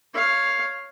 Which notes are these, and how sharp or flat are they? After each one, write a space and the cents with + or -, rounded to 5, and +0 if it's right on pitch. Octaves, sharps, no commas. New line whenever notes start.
C#5 +0 F5 +0